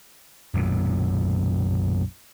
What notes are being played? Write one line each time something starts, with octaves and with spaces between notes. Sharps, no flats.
F#1 B1 F#2 A#2